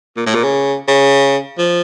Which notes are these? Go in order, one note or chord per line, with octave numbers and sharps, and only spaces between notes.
A#2
A2
A#2
C#3
C#3
F3